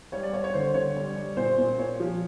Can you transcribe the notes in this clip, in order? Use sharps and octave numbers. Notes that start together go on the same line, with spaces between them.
G3 C#5
D5
G3 C#5
C#5
D3 C5
D3 C#5
G3
G3
A#2 C5
A#2
A#2 C#5
F3